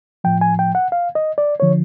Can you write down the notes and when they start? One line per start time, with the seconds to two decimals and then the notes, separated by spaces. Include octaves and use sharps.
0.24 A2 F3 G5
0.41 G#5
0.59 G5
0.75 F#5
0.92 F5
1.15 D#5
1.38 D5
1.60 D3 F3 C#5